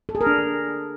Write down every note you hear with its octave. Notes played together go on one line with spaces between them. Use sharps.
A4
G#4
A#4
D4